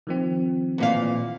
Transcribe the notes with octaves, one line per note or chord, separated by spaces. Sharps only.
D#3 F3 C4
E2 A#2 F5